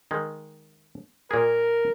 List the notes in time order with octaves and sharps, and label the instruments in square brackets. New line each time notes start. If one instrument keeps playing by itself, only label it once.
[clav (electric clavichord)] D#3 G#3
[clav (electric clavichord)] A#2 G#4 [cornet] A#4